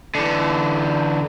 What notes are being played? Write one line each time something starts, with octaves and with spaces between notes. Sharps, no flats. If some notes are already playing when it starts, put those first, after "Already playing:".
D3 E3